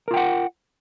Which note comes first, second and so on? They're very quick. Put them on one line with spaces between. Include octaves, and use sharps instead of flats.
A#4 F4 G5 F#5